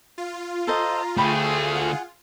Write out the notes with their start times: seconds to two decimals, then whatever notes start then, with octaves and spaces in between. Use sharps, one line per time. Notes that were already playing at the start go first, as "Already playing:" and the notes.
0.18 F4
0.67 A4 C5 D#5 A#5
1.17 D3 A3 G#4 C#5 G5 B5
1.71 F#5 G#5